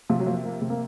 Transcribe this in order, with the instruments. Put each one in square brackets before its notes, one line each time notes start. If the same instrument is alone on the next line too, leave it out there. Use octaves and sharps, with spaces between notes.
[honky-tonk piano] C3 [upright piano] F3
[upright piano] F#3
[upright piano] F3 [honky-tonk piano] A#3
[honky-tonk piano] F3 [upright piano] A#3
[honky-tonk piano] C3
[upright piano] A#3